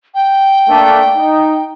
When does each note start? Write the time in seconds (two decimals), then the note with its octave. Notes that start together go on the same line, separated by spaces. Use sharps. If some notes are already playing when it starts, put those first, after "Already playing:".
0.15 G5
0.69 A3 A#3 D4
1.16 D#4